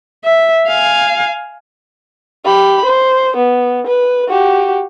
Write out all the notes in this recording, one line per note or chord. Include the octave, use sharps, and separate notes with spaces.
E5
F5 G#5
G4 B5
C5
B3
B4
F#4 G4